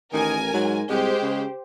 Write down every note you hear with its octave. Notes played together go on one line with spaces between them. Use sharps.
A1 D#3 A#4 G#5
G#2 F#3
C2 G#3 G4 C5
C#3